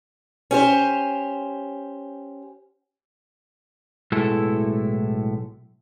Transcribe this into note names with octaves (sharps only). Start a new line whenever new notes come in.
C#4 G4 C5
B1 A2 G#3 A3 E4 A4